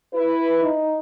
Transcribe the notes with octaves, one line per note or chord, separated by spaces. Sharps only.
E4 B4
D#4